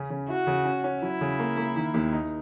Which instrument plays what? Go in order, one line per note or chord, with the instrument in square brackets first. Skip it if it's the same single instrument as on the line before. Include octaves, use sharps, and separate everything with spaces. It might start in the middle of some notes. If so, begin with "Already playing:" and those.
Already playing: [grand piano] C#3 C#4
C#3
[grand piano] E4 [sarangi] F#4
[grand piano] C#3
C#4
C#4
[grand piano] F#3 [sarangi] E4
[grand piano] C#3
A#3
A#3
D#3
D#2
D#4